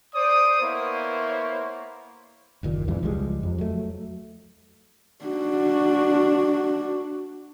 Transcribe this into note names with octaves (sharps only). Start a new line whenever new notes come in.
C5 D5 D#6
A#3 B3 E4 C5 C#5
F#1 D#2 A#2
E2 G#2 C3 E3
C#2 F3 G3 G#3
F2
F#3 A3
D4 F#4